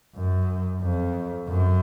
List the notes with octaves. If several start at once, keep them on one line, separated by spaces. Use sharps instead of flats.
F#2
F2
F#2